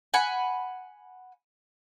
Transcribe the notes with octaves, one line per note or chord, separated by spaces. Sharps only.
F#5 G#5 B5